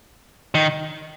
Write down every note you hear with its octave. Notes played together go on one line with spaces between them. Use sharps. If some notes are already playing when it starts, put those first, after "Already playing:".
D#3